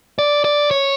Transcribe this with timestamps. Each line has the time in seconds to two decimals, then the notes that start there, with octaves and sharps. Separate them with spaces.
0.19 D5
0.45 D5
0.71 C#5